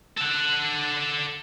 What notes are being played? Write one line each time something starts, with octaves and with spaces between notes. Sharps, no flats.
A4 F#5